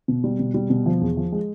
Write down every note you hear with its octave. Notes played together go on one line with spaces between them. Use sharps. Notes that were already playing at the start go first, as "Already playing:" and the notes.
B2
G3
B2
G3
B2
F3
E2
F3
G#3